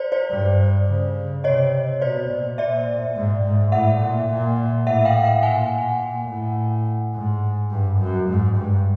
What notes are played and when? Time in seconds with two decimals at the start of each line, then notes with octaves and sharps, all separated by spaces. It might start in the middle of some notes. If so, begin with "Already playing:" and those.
Already playing: C5 D5
0.12 C5 D5
0.30 G2
0.88 C#3
1.44 C3 C#5 D#5
2.01 B2 C5 D5
2.30 A#2
2.58 A#2 D5 E5
3.16 G#2
3.44 G#2
3.72 A2 E5 F#5
4.01 A#2
4.29 A#2
4.87 A2 E5 F#5
5.05 F5 G5
5.24 F5 G5
5.43 A#2 F#5 G#5
6.00 A#2
6.29 A2
7.14 G#2
7.71 G2
8.00 F#2
8.29 G#2
8.57 G2